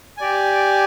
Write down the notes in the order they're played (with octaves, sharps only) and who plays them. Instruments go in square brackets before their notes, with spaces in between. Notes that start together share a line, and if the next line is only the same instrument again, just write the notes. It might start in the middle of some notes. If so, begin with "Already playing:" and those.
[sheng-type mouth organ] G4 D5 G#5